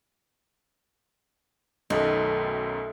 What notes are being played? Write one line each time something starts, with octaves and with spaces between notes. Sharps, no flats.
B1 F#2 D#3 A3 A4 D#5